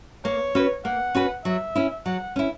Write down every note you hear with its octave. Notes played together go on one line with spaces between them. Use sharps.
A#3 C#5
C#4 F#4 B4
A#3 F#5
C#4 F#4 B4
F#3 E5
C#4 E4
F#3 F#5
C#4 E4